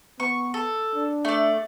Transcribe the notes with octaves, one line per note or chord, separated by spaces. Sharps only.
B3 C#6
A4
D4
A3 D5